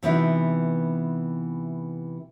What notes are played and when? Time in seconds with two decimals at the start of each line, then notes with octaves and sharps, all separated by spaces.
0.03 C3 E3 B3 D#4 E4 F#4